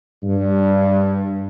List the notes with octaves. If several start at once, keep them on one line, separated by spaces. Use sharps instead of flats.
G2